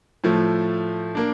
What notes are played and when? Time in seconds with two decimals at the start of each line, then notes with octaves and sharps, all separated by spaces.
0.24 A2 F3 A3
1.15 A#3 D4